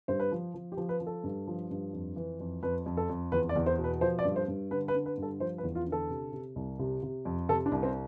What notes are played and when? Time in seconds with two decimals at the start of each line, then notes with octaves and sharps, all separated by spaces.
0.08 G2 C5
0.20 B4
0.32 F3
0.54 F3
0.72 G4
0.77 F3
0.89 B4
1.00 F3
1.07 A4
1.24 G2
1.47 F3
1.71 G2
1.93 F2
2.16 E3
2.40 F2
2.63 F2 B4
2.86 F2
2.97 A4
3.09 F2
3.32 E2 B4
3.49 D5
3.56 E2
3.66 C5
3.78 B2
3.84 B4
4.01 F3 C5
4.19 D5
4.25 G2
4.36 C5
4.48 G2
4.71 D3 B4
4.88 B4
4.94 D3
5.06 B4
5.17 G2 A4
5.40 F3 C5
5.58 B4
5.63 E2
5.75 F4
5.87 D3
5.92 A4
6.10 C3
6.32 C3
6.56 C2
6.79 C3
7.03 C3
7.25 F2
7.49 C3 A4
7.66 D4
7.72 C2
7.83 C4